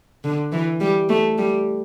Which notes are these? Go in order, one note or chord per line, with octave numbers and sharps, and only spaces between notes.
D3
E3
G3
A3
G3